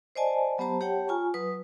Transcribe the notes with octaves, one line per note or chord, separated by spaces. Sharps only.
C5 D5 D#5 G#5 A5
F#3 B3 G4 C5 A5 A#5
G4 C#5 F#5 G5 A5
F4 G#5 A#5 C#6
F#3 B4 D#6